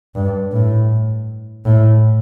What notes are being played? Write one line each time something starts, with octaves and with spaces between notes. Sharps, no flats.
G2
A2
A2